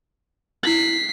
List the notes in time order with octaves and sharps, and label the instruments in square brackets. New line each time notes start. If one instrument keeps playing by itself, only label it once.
[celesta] E4 F#7 [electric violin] B6 C7